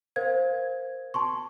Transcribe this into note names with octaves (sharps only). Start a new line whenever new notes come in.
A#4 C5 F5 G#6
A5 C6 C#6